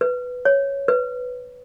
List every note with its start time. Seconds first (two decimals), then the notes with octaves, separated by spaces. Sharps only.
0.01 B4
0.45 C#5
0.88 B4